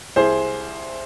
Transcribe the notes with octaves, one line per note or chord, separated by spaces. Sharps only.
C2 G#4 C5